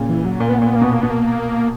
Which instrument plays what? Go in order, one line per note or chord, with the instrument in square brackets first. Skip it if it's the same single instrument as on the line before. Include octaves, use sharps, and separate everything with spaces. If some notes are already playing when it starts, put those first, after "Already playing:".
Already playing: [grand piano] A#2 C#3
[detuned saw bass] E3
F#3
[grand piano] A#2 [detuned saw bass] A#3
[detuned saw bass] B3
[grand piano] A#2 [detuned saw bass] A#3
[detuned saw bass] B3
A#3
[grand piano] B2 [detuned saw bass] B3
[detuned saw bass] A#3
[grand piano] B2 [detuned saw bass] B3
[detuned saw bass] A#3